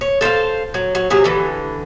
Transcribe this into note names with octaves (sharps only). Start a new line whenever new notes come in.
C#5
A4 C5 E5 F5
F#3
F#3
C3 F#3 G#4
D3 E3